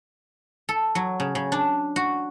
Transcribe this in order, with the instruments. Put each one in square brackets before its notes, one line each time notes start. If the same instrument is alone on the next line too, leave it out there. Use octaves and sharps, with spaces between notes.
[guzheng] A4
F#3
C#3
C#3
D4
F#4